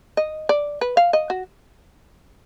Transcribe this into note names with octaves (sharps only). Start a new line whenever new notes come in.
D#5
D5
B4
F5
D#5
F#4